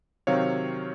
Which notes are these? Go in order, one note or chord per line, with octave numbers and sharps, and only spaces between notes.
C3 D#3 F#3 C4 C#5 F5